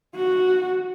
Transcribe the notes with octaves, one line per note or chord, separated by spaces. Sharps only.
F#4